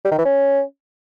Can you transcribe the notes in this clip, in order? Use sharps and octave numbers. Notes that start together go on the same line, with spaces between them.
G3
D#3
E3
C#4